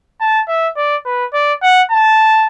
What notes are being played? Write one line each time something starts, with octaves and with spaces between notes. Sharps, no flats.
A5
E5
D5
B4
D5
F#5
A5